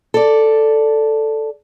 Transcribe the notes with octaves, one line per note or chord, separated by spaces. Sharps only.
A4 D5